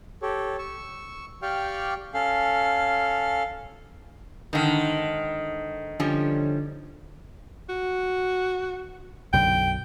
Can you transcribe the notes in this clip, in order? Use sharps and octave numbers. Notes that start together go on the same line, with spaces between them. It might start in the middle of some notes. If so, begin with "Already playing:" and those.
G4 A4 C#5
C#6 E6
G4 D5 F5 G5 C#6 F6
C#4 A4 F5
G#2 D3 D#3
D3 F3 G3 C#4
F#4
B1 F#2 D3 G5